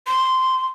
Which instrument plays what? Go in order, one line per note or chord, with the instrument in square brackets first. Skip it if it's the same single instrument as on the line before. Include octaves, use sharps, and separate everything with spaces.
[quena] C6